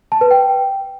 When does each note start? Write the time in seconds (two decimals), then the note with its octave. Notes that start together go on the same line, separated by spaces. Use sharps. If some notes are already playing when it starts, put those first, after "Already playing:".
0.12 A5
0.21 B4
0.31 G5